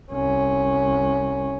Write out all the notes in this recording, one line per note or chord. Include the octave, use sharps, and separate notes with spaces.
C2 C#4